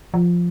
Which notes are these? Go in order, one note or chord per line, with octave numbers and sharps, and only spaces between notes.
F3